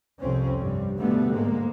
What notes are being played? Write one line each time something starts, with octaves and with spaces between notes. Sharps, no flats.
C2 F2 C4 C#4
G2 G3
B2 D3 G3 A3 B3
G#2 G#3 A#3